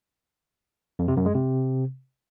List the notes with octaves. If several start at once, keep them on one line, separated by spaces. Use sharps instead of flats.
F2
C3
F#2
G#3
C3